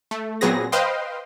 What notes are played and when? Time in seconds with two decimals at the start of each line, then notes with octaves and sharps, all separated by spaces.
0.11 A3
0.41 A#2 F#3 B3 C4 G#4 A#6
0.72 B4 C5 D#5 F5 G5 C6